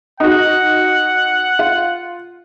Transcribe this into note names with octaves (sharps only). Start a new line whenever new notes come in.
D#4 F#4 F#5
F4